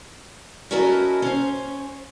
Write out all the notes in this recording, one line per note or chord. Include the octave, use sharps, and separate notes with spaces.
C#4 E4 F#4 A4 A#4 D#5
C#4 C5